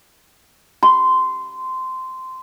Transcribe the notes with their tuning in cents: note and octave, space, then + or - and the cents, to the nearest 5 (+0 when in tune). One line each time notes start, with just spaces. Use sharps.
C6 -15